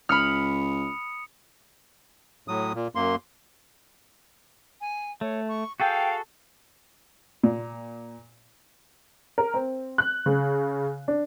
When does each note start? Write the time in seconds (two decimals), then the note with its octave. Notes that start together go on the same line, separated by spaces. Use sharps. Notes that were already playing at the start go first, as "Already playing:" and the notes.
0.09 C#2 B5 D#6 F6 C#7
2.48 A2 F#3 D#6
2.75 A#2
2.95 F#2 A#3 C6
4.81 G#5
5.21 A3 C#5
5.48 C#6
5.80 F#4 G#4 A4 F5 G5
7.43 A#2
9.38 A#4
9.54 C4
9.98 F#6
10.26 C#3
11.08 D4